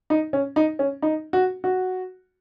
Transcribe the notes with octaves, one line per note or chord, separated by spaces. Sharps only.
D#4
C#4
D#4
C#4
D#4
F#4
F#4